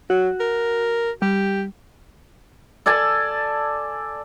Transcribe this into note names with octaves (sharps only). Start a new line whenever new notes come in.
F#3 F#4
A#4
G3 G4
A4 D5 G#5 A5